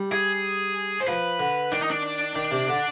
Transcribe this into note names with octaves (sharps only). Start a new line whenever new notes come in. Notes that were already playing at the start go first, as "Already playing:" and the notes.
Already playing: G3
G#4
C5
F3 B4
D3
D#3 D4
D#4
D4
D#3
C3
D3